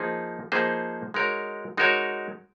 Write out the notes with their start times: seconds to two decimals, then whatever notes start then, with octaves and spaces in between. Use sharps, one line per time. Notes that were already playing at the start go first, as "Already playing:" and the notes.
Already playing: F3 A#3 D#4 G#4 C5
0.52 F3 A#3 D#4 G#4 C5
1.14 G#3 D#4 F#4 A#4 C#5
1.77 G#3 D#4 F#4 A#4 C#5